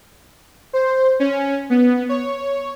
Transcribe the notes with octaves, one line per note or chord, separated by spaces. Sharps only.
C5
C#4
B3
C#5